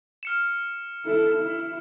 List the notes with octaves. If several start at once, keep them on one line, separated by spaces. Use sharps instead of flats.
F6 C#7 E7
E4 A4
E4